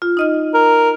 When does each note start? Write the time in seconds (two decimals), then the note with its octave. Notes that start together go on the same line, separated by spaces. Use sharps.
0.02 F4
0.17 D#4 D#5 F6
0.54 A#4